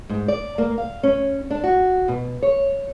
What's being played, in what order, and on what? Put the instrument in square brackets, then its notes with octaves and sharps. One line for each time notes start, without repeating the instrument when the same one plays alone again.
[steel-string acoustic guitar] G#2
D5
A#3
F5
C#4
D4
F#4
B2
C#5